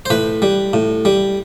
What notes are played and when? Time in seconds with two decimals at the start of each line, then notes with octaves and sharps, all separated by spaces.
0.06 C5
0.10 A2 B4
0.42 G3
0.73 A2
1.05 G3